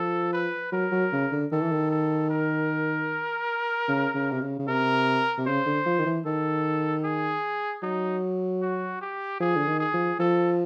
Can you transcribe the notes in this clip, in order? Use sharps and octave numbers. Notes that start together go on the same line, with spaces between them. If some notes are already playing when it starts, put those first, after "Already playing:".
Already playing: F3 A4
B4
F#3 A#4
F#3
C#3
D3
D#3 A4
E3
D#3
A4
A#4
C#3
C#3
C3
C#3
C#3
C3 A#4
C3
C#3 C5
D3
F3
D#3
E3
D#3 A4
G#4
F#3 D#4
F#4
G4
F3 G#4
D3
D#3
G#4
F3
F3 A4